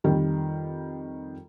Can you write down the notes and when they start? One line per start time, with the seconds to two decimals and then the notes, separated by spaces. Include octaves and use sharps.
0.04 F2 D#3 G3